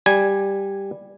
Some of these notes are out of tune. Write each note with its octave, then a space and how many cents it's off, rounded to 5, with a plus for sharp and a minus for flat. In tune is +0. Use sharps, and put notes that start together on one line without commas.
G3 +5 G#5 -5